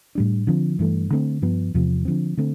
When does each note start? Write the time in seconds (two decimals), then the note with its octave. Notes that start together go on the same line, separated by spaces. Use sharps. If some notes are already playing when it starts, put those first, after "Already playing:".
0.15 A2 G3 D4
0.47 D3 F3 C4
0.79 G2 E3 A3
1.11 D3 A3 C4
1.42 G2 F3 B3
1.74 E2 C3 F3 C4
2.05 D3 F3 C4
2.37 D3 A3 C4